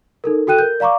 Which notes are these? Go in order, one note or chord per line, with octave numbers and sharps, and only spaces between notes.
D#4 A4 A#4
F#4 A4 G5 F#6 D#7
A#4 G6
D5 F5 A#5 C#6 D6